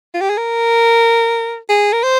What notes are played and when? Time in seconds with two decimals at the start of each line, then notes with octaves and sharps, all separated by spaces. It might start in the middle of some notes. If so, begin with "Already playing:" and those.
0.14 F4
0.21 G4
0.30 G#4
0.37 A#4
1.69 G#4
1.92 A#4
2.03 C5